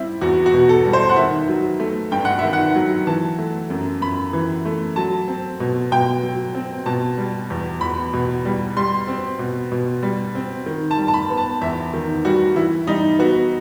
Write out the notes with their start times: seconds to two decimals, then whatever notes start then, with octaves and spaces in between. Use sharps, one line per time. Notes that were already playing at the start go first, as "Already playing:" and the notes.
Already playing: G3 C4 E4
0.21 E2 F#4
0.46 F#4
0.54 B2
0.69 A4
0.86 G3
0.93 C5
1.09 F#5
1.16 D#3 E5
1.49 F#3
1.80 A3
2.11 G2 G5
2.25 F#5
2.39 D#3 E5
2.53 F#5
2.75 F#3
3.07 E3 A5
3.38 A3
3.70 F#2
4.01 F#2 B5
4.33 E3
4.65 A3
4.96 F#3 A5
5.28 C4
5.60 B2
5.92 B2 G5
6.23 F#3
6.55 C4
6.86 B2 A5
7.18 G3
7.50 E2
7.81 E2 B5
8.13 B2
8.45 G3
8.77 G3 C6
9.07 C4
9.39 B2
9.72 B2
10.03 G3
10.35 C4
10.66 D#3
10.91 A5
10.98 G3
11.08 A5
11.14 B5
11.30 B3
11.37 A5
11.61 E2 E5
11.94 D#3
12.25 G3 F#4
12.56 E3 E4
12.87 G3 D#4
13.19 B3 F#4